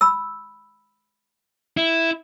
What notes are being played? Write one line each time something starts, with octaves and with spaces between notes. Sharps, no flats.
B5 E6
E4